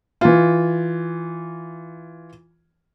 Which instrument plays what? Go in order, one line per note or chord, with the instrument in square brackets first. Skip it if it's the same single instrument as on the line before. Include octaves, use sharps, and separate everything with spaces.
[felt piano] E3 F4